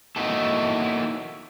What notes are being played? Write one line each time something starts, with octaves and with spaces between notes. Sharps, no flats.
A#3 D#4 E4 F#4 A4